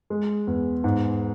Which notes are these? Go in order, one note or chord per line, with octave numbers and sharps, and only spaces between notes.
G#3
E2
G#2